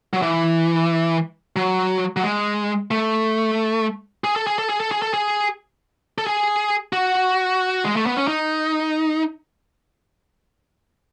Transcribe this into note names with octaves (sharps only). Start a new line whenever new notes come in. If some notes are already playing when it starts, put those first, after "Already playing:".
F#3
E3
F#3
F#3
G#3
A3
G#4
A4
G#4
A4
G#4
A4
G#4
A4
G#4
A4
G#4
F#4
G#3
A3
B3
C#4
D#4